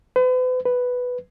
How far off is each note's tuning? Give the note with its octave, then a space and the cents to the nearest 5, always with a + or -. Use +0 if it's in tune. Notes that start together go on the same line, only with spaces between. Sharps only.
B4 +45
B4 +5